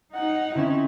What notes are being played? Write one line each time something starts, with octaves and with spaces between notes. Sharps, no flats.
D#4 F#5
D3 C4 C#4 E4